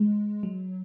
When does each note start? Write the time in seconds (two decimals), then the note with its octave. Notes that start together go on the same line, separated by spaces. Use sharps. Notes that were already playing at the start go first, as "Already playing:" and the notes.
Already playing: G#3
0.43 F#3